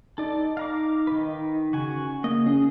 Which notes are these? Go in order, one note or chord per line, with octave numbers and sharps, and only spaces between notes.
D#4 A4 D5
F5 A#5 D6
D#3 B4
C#3 F#4 G#5
A#3 D#5
C#4 G#4